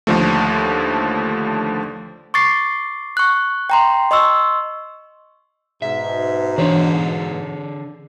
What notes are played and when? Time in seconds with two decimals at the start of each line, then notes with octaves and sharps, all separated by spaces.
0.07 D#2 D3 F3 A3
2.34 C#6 D6 A6 C7
3.17 C#6 F#6
3.70 G5 A#5 C6
4.11 D#5 C6 C#6 E6
5.82 G#2 B2 E5
6.58 D3 E3 D4 G#4 D5